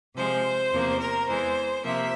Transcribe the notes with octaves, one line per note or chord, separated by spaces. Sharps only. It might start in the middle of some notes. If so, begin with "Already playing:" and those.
C3 F3 G#3 C5
E2 C3 F3 A#3
A#4
E2 E3 G#3 C5
C3 F3 A#3 E5